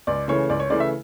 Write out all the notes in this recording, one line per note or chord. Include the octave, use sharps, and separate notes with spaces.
C#2 D5
C#3 E3 A3 C#5
C#2 D5
C#5
C#3 E3 A3 D5
E5